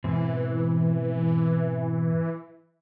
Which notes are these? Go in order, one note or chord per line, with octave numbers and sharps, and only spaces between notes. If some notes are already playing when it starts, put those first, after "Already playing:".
G#2 B2 E3 C4